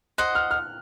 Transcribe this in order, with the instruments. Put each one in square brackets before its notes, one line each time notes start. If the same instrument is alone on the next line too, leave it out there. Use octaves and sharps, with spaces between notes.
[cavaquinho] C5 D#5 F#5 [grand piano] F#6
[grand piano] F6
F6